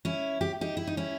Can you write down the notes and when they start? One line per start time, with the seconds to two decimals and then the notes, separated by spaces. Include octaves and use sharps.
0.05 C#4 E4
0.41 G4
0.61 D#4 G4
0.77 E4
0.87 D#4
0.97 C#4 E4